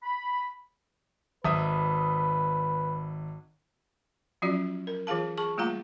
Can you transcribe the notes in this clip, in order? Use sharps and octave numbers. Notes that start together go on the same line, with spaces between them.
B5
G#1 B4 E5 D#6
F3 F#3 C#4 F4 F#4 D5
A#4
E3 F4 G#4 F5 A5
G#4 A5 C#6
G3 A3 A#3 F4 F5 A#5